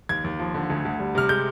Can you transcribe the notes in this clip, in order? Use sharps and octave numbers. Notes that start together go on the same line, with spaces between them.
D#2 G#6
D#2
F3
D3
D2
D2
G3
C3 F6
G#3 G6